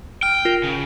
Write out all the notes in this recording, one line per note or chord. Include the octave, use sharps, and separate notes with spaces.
G5 F6
F4 A#4
C#3